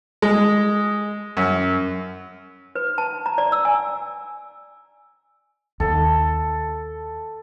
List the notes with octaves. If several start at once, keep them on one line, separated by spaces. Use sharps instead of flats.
G#3
F#2
B4
A5
A#5
D5
E6
G#5
D#2 A4